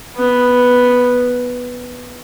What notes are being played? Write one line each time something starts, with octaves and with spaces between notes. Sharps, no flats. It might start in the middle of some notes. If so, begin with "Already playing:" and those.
B3